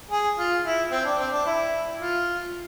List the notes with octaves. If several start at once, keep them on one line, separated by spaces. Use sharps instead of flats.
G#4
F4
E4
C4
D4
C4
D4
E4
F4